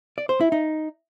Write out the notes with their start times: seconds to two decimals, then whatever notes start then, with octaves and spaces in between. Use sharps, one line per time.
0.18 D5
0.29 C5
0.41 E4
0.52 D#4